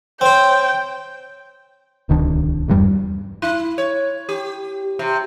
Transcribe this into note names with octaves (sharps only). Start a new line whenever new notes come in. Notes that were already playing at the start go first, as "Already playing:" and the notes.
C4 C5 C#5 G5
D1 C2 D#3 D4
D#1 E2 G2 G3
E4
C#5
G4
C3